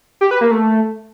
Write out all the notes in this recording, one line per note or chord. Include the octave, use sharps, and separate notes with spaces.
G4
B4
A#3
A3